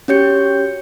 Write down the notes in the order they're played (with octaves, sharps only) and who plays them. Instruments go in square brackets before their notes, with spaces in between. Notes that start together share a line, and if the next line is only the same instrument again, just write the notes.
[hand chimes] C#4 F#4 G4 C#5 G6 C#7